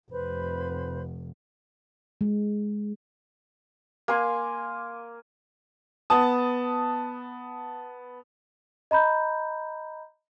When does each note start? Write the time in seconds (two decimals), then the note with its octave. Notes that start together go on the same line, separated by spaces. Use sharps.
0.12 F1 B4 C5 B5
2.21 G#3
4.08 A#3 G#5 C6 D6
6.10 B3 A5 D#6
8.91 D#5 A#5 B5 G6